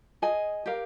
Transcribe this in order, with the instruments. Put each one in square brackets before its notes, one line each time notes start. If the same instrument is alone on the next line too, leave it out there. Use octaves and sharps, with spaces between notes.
[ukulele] G#4 D#5 G#5
G4 A#4 F5